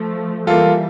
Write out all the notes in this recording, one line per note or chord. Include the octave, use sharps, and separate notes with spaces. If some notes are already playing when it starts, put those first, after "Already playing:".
Already playing: F3 A3
E3 G3 A#3 F4 A4